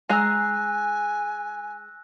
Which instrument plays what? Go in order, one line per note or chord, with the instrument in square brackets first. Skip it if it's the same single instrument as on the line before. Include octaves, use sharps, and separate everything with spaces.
[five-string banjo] G#3 G#4 A#5 [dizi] G#5 [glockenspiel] E6 F#6 A#6